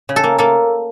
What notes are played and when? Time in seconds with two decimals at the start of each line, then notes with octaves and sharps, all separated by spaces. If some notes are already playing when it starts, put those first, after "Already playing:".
0.09 C#3
0.16 A4
0.23 A#3
0.38 A#3 A4